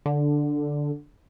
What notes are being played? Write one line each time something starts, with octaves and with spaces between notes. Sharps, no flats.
D3